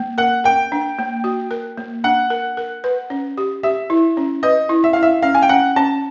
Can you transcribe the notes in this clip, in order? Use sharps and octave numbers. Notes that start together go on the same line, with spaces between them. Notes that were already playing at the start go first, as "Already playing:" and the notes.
Already playing: A#3
A#4 F#5
A#4 G5
D4
A#3
F#4
A#4
A#3
D4 F#5
A#4
A#4
B4
C#4
G4
G4 E5
E4
C#4
B4 D#5
E4
E5
E4 F5
E5
C#4 F5
G#5
G5
C#4 F#5
C#4 A5